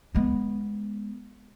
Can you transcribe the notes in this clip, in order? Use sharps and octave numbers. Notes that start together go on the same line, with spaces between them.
G#3 B3